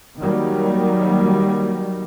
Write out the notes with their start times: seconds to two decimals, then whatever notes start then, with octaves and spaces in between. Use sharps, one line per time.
0.19 D#3 F#3 G3 A#3